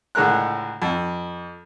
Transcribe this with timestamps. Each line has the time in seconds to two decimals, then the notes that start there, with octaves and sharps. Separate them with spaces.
0.15 C#2 A2 D3 G#3 A#4 F#6
0.82 F2